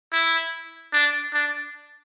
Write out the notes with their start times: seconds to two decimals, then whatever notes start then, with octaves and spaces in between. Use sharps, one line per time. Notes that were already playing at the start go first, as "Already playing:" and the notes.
0.13 E4
0.93 D4
1.34 D4